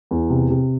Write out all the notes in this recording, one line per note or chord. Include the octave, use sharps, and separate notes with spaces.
E2
C3
C3